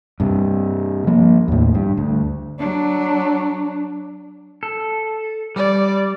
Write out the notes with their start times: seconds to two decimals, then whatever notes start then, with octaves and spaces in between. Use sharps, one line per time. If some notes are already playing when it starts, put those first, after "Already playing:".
0.20 G2 C3
1.07 F3 A#3
1.48 D#2 A2
1.75 G2
1.97 D2
2.59 F#3 D4
4.63 A4
5.56 G3 D5